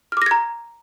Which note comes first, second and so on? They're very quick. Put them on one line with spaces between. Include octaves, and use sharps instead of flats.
F6 D6 A#6 G#6 A#5